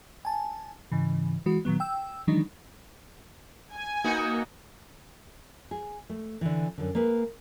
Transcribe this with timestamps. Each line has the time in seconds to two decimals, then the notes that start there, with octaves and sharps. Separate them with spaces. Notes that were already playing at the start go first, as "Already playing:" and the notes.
0.25 G#5 A5
0.92 G#2 C#3 E3
1.46 E3 G#3 F#4
1.65 A#2 D#3 F#3 B3
1.80 G5 E6
2.27 D#3 E3 F#3 G#3 D4 D#4
3.72 G#5
4.04 A#3 B3 D#4 F#4
5.71 G#4
6.09 A3
6.41 D3 E3
6.78 F#2 D3
6.95 A#3 G#4 B4